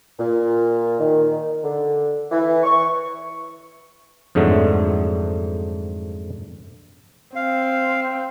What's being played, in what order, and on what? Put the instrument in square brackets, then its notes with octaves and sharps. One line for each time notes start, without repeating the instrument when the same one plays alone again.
[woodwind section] A#2
D#3
D3
E3
C#6
[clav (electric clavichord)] F2 G#2 D3 F#3 A3
[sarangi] C4 [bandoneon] F5